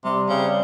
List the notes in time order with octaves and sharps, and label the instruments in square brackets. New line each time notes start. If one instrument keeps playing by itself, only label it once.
[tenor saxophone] C3 [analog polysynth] G3
[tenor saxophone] C#3 [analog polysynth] C4